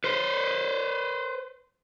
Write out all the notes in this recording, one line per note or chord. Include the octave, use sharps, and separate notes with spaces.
B4 C5